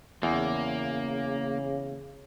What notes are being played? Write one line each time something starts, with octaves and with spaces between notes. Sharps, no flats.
E2 C#3 A#3